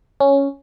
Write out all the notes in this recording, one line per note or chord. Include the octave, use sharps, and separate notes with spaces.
C#4